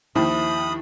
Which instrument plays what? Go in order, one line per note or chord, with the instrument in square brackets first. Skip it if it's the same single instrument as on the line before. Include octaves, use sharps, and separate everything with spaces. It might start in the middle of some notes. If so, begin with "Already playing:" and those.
[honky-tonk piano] D#2 D#3 F3 [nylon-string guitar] E4 [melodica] B5 D#6